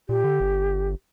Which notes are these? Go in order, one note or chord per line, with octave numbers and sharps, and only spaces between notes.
A#2 G4
D3
G1